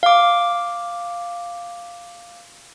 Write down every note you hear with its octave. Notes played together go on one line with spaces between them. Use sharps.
F5 D6